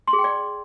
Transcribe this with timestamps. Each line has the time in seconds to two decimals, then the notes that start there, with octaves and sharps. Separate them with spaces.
0.07 C6
0.13 G#4
0.19 G5
0.24 D5